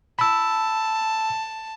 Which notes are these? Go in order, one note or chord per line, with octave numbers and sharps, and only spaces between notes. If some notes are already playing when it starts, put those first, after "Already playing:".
A5 B5 E6